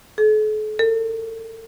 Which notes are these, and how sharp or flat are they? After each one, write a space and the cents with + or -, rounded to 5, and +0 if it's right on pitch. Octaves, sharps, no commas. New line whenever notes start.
A4 -45
A4 +45